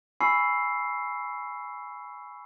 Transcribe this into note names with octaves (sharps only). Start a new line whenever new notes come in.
G#5 B5 C#6 E6 C7